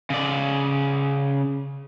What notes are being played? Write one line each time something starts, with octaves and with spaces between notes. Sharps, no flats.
C#3 D5